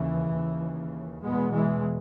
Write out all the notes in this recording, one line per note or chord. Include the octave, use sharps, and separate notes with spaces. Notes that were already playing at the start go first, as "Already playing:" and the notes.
Already playing: D#2 C#3 E3
D#2 C#3
E2 B2 G#3 B3
E3 G#3